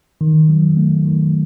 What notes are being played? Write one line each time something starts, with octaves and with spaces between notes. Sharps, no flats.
D#3
F#3
A3
D#3